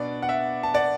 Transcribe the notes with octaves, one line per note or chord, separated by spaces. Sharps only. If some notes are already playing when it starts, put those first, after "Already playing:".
Already playing: B2 B3 D4 D5
F#5
E5
A5
D5 F#5